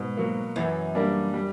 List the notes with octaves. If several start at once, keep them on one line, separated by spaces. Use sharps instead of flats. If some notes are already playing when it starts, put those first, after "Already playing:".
Already playing: G#2 B2
F#3 A#3
F#2 E3
G3 A#3 D4
G3